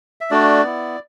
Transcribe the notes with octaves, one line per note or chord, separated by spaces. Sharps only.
E5
A3 D4 F#4 D5
B3 E4